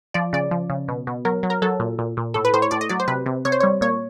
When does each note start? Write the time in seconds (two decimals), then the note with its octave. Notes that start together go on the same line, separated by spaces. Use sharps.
0.14 F3 D5
0.33 C#3 D5
0.51 F3
0.70 C#3
0.88 B2
1.07 B2
1.25 F#3 A#4
1.43 F#3
1.50 A#4
1.62 F#3 A4
1.80 A#2
1.99 A#2
2.17 A#2
2.34 A2 A4
2.45 B4
2.54 A2 C5
2.62 C#5
2.71 A2 D5
2.81 D#5
2.89 F#3 D5
3.00 C5
3.08 C3 B4
3.26 C3
3.45 C3 C#5
3.52 C5
3.60 G3 C#5
3.81 A#2 C#5